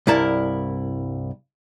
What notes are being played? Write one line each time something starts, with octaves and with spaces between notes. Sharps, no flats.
C2 G2 E4 A#4 A5